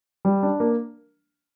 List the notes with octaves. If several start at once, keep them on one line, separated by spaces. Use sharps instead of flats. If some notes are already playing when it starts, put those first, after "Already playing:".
G3
D4
A#3